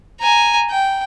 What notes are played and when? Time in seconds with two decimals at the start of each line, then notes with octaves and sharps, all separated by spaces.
0.21 G#5 A#5
0.71 G5